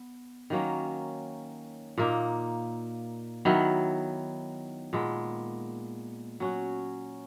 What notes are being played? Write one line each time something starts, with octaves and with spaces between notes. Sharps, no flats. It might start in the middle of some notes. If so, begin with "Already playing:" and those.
Already playing: B3
D#3 F#3 A#3 C#4
A#2 A#3 D#4
D#3 F#3 B3 E4
A#2 G#3 B3
F#3 C#4 F#4